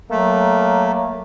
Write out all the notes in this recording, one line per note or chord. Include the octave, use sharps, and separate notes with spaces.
F#3 A3 A#3